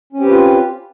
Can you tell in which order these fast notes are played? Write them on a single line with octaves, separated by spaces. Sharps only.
C#4 C4 G4 B4 F4